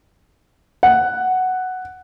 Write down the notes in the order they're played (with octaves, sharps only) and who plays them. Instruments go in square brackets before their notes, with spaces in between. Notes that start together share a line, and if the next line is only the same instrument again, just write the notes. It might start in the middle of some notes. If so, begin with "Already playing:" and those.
[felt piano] F#5